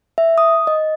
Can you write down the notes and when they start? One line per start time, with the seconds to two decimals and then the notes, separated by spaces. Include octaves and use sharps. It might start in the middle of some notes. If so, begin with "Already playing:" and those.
0.18 E5
0.38 D#6
0.67 D#5